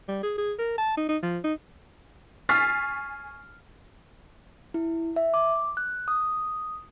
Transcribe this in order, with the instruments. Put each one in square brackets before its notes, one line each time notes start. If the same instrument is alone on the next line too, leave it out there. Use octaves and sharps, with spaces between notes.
[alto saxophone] G3
G#4
G#4
A#4
A5
D#4
D#4
F3
D#4
[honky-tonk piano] G#5 C#6 F6 A6 B6 C7
[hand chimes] E4
E5
D6
F#6
D#6